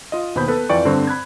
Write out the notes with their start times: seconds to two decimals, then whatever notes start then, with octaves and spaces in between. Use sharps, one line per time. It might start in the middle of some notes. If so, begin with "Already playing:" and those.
0.12 F4 D#5
0.35 D#2 B2 C5 B5 G6
0.48 B3 A4 B4
0.69 F2 E3 F4 D5 G5 C#6
0.85 G2 D3 C4 C5 C#6
1.07 B5 F#6 G#6